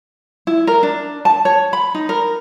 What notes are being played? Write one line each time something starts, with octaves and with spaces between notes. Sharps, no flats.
E4
A#4
D4
A5
C#5
B5
D#4
A#4